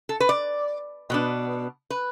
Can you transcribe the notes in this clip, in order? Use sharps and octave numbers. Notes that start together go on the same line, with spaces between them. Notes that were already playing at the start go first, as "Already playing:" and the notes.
A4
B4
D5
B2 B3 D4
B4